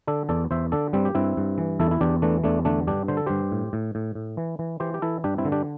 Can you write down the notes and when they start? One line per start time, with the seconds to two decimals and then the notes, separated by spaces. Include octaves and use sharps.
0.07 D3 A4 D5
0.29 E2 A4 D5
0.51 E2 C5 E5
0.72 D3 A4 D5
0.93 G2 G3 C4
1.05 G4
1.15 G2 C4 E4
1.37 G2
1.58 E3
1.79 E2 E4 A4
1.91 E4
2.01 E2 D4 G4
2.22 E3 A3 D4
2.44 E2 A3 D4
2.65 D3 A3 D4
2.87 G2 D4 G4
3.08 D3 C5
3.17 A4
3.26 G2 G4 C5
3.52 A2
3.73 A2
3.95 A2
4.15 A2
4.37 E3
4.59 E3
4.80 E3 G4 C5
4.94 G4
5.02 E3 E4 A4
5.24 G2 D4 G4
5.38 C4 E4
5.45 D3
5.52 D4 G4